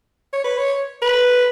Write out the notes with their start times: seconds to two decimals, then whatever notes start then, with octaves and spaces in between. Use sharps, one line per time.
0.33 C#5
0.44 B4
0.58 C#5
1.02 B4